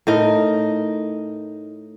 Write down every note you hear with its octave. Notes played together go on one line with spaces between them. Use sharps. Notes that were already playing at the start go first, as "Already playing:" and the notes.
A2 D#4 A#4